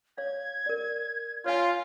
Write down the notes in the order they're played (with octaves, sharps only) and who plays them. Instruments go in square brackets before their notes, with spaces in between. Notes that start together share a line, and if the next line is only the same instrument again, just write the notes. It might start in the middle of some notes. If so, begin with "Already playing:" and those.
[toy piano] C#5 F5 [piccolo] G#6
[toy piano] A#4 D5
[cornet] F4 [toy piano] C#5 F5 G#5 [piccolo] F6